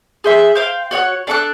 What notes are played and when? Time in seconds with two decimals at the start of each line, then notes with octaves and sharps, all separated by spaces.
0.24 G#4 C5 E5
0.55 C5 F5 G5
0.91 F#4 C#5 D#5 F#5
1.27 D4 A4 D6 F#6